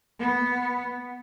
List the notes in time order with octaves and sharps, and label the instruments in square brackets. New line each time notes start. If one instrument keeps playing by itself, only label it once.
[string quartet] B3